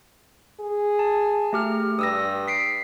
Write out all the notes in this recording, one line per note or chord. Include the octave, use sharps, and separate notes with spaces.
G#4
A5
A3 G4 F6
G2 D#6 E6 A#6
B6 C7 D7